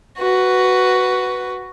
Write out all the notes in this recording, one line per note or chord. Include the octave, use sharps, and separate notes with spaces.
F#4 B4